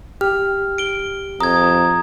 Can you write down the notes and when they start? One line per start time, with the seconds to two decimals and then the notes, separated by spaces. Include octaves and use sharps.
0.21 G4 F6
0.78 D7 G7
1.41 F2 A#5 D#6 G#6